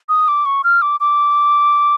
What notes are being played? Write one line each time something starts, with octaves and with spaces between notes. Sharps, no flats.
D#6
D6
C#6
F6
D6
D6